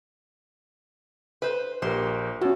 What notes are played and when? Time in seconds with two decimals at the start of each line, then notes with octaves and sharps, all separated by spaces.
1.42 B4 C5
1.82 A#1 G4 A#4 C5
2.41 E2 C#4 F#4